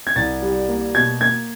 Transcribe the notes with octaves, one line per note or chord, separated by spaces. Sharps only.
G#6
C2 A6
G3
A#3
B2 G#6
A#3 G#6